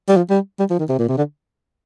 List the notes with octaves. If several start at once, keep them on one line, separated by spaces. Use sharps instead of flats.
G3
F3
G3
G3
F3
D#3
C3
A#2
C3
D3